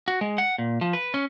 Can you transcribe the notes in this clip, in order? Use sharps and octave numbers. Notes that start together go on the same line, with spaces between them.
F#4
G#3
F#5
A#2
F3
B4
C#4